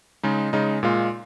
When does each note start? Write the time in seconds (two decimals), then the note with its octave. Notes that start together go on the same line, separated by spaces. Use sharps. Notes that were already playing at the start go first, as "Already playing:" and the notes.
0.23 C#3 G#3 D#4
0.53 C#3 G#3 D#4
0.83 A#2 G#3 F4